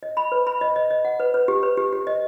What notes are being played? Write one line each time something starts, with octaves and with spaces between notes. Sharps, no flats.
D#5
B5
B4
B5
D#5
D#5
D#5
F#5
B4
B4
G4
B4
G4
G4
D#5